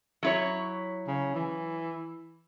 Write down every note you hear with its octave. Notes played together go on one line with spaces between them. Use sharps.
F#3 E4 C#5
C#3
E3